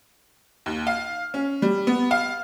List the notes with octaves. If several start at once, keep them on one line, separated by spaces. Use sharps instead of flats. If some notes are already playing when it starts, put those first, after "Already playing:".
D#2
F5
C#4
G3
B3
F5